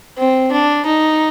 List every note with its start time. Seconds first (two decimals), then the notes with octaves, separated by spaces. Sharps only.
0.18 C4
0.52 D4
0.86 D#4